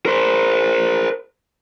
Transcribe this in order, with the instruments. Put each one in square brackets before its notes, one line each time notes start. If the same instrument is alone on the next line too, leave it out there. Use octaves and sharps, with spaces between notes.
[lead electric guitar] A#4 C5